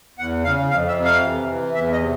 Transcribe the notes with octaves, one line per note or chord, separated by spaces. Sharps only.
E2 F#5
C#3 F5
F2 F5
E5
C3
F5
E3
E3
E2 E5
D#5
C3